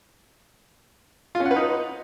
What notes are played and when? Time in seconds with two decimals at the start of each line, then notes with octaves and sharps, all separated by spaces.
1.35 F4
1.40 C#4
1.45 F#5
1.51 B4
1.56 D#4